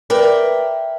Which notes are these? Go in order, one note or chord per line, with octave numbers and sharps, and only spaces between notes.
A#4 B4 D5 E5 G5